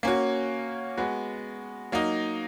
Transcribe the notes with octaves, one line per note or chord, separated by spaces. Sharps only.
A#3 C#4 F#4
G#3 B3 F#4
F#3 A#3 D#4